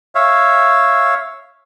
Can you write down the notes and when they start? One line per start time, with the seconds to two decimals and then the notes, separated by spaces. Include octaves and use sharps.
0.15 C#5 E5 F5